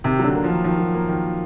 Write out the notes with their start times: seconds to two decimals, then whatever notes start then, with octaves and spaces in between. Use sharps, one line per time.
0.04 C3 D#3
0.19 D3 F#3
0.35 A#3
0.44 D#3 F3
0.64 D#3 F3
0.79 F#3
0.94 A#3
1.08 D#3